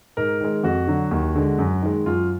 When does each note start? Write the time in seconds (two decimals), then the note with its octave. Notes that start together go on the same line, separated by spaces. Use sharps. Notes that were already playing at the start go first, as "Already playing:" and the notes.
0.17 G#2 A#4
0.40 D#3 G#3
0.63 F2 F#4
0.88 D3 F#3
1.11 D#2
1.35 D3 G#3
1.59 F#2
1.82 D#3 G#3
2.06 F#2 F4